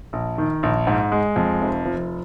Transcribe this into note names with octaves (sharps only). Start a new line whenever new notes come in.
A#1
D#3
A#1
G#2
G#3
F2
F1
F3